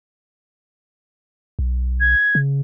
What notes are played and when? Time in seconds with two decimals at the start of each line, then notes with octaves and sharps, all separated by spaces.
1.59 B1
2.00 G#6
2.35 C#3